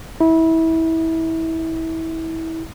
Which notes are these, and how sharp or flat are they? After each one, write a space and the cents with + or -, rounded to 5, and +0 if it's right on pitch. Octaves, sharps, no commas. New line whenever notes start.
E4 -25